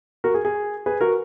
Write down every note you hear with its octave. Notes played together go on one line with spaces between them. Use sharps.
F#4 A#4
G#4
G#4
G#4 B4
F#4 A#4